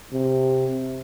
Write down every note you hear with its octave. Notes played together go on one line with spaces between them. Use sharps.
C3